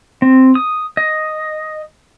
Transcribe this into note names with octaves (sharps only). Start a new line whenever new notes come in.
C4
D#6
D#5